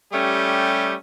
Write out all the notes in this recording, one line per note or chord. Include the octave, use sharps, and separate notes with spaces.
G3 A3 C#4 G4